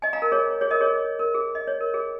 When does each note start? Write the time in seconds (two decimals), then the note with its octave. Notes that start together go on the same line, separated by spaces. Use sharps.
0.02 D#5 G#5
0.13 F5 A#5
0.22 A#4
0.32 G#4 C#5
0.61 G#4 C#5
0.71 A#4 D#5
0.81 G#4 C#5
1.19 A#4
1.34 G#4
1.55 D#5
1.67 C#5
1.81 A#4
1.94 G#4